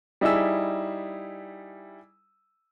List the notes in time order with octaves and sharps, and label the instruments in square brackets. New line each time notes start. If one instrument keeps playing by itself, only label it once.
[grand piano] G3 D#4 E4 G#4 E6